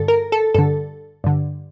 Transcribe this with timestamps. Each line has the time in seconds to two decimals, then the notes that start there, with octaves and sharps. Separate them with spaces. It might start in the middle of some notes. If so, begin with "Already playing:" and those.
Already playing: G2 D3 A4
0.08 A#4
0.32 A4
0.54 G2 D3 A4
1.24 G2 D3